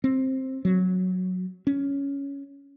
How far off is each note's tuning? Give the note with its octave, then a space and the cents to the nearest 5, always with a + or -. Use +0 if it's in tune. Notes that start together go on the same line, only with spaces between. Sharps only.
C4 +10
F#3 -5
C#4 +10